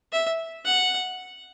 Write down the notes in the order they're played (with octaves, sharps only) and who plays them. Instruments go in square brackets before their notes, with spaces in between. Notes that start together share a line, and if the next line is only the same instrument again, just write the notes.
[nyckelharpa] E5
F#5